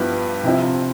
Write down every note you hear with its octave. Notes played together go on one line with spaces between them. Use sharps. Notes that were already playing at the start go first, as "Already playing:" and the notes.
Already playing: G2 F3 B3 E4 G4
C3 F3 C4 E4